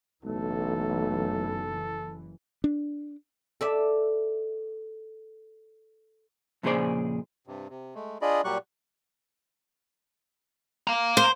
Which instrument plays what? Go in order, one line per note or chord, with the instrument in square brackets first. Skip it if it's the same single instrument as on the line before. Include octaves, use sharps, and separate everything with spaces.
[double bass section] F#1 E3 [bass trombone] B1 [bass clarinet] A3 [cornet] A4
[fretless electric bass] D4
[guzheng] A4 D5 E5
[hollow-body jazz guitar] F2 A#2 C#3 G#4 C5 D5
[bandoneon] G2 C3
C3
G#3 A3
D4 F4 G#4 D5 D#5 B5
A#2 F#3 G3 G4 C#6 F#6
[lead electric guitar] F5 A#5
[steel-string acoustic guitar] C5